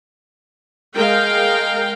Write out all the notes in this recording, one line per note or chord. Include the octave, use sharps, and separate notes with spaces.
G#3 A#4 F5 G5